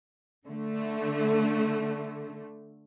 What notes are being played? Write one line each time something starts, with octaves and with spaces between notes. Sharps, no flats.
D3 A3